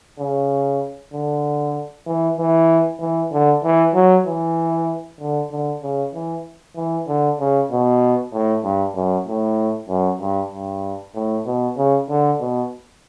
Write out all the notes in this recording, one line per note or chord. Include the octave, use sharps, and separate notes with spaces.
C#3
D3
E3
E3
E3
D3
E3
F#3
E3
D3
D3
C#3
E3
E3
D3
C#3
B2
A2
G2
F#2
A2
F#2
G2
G2
A2
B2
C#3
D3
B2